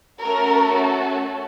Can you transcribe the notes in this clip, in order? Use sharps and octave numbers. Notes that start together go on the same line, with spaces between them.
A3 C#4 F#4 A4 A#4